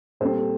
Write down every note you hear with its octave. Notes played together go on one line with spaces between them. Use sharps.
A#2 G3 C4 A4 C5